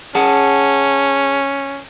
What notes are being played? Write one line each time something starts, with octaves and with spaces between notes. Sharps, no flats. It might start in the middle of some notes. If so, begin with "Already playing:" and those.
C#4 G#4 F#5 A5